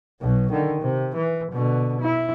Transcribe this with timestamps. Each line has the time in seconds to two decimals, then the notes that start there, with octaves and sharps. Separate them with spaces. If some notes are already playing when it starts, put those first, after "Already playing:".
0.21 B1 B2
0.52 D3 D#3
0.82 C3
1.16 E3
1.52 B2 D3
2.01 E4